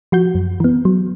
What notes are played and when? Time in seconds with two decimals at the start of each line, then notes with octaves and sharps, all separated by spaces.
0.12 F3 F#4 G6
0.35 F#2
0.60 E3 B3
0.85 F#3